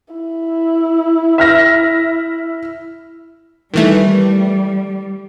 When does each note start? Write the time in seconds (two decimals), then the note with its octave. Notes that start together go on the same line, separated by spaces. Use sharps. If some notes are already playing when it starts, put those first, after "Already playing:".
0.14 E4
1.38 E5 F6 A#6
3.74 D#3 E3 G3 A3